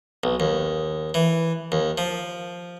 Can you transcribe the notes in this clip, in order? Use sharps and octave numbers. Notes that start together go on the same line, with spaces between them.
B1
D#2
E3
D#2
F3